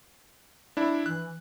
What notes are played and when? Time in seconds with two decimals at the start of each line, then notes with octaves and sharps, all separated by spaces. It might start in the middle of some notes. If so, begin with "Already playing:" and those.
0.77 D4 E4
1.06 E3 F#6